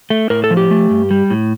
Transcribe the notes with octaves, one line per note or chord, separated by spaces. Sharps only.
A3
A2 A#4
A4
F3
G4
A3
G2
G3
A2